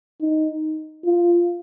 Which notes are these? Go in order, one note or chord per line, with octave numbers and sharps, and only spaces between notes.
D#4
F4